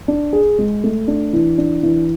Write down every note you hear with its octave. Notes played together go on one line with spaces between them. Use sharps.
D4
G#4
G#3
A3
D4
E3
D4
E3